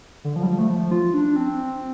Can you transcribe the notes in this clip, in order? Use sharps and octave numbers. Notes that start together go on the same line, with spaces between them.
D3
F3
G3
F3
A3
F3
F4
D4
C4